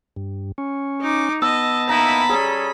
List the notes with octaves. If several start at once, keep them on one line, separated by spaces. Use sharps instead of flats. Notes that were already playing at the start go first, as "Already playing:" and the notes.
G2
C#4
D#4 D6
B3 D#5 A5 E6
A#3 D#4 E4 A#5 B5
G3 C#4 G#4 A4